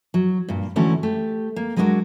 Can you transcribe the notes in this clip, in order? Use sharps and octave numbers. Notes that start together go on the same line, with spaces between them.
F#3
G2 A#2
D3 E3 A3 C#4 E4 F#4
A3 G4
A#3
F#3 G#3 B3 D4 F#4 A#4